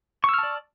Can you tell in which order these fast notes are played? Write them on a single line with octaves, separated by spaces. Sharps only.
C#6 E6 F6 A5 D5